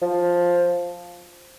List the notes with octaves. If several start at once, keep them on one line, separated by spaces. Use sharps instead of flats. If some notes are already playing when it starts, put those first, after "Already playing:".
F3